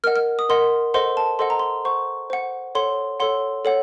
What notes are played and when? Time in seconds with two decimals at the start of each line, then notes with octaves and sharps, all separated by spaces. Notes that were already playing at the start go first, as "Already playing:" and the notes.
0.04 A#4 D#5 F#5 F6
0.16 F6
0.39 D#6
0.49 A#4 D#5 F#5 C6
0.94 A4 C5 D#5 F#5 C6
1.17 A5
1.39 A4 C5 D#5 F#5 C6
1.50 A#5
1.59 C6
1.85 C5 F#5 C#6
2.30 C5 F#5
2.75 A4 C#5 F#5 C6
3.20 A4 C#5 F#5 C6
3.65 A4 C#5 F#5